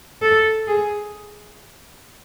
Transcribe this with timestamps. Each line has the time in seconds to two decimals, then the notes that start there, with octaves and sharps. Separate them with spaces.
0.22 A4
0.67 G#4